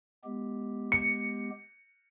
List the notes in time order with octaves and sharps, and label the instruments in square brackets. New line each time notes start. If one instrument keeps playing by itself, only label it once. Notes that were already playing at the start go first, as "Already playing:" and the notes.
[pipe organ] G#3 B3 G4
[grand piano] C#7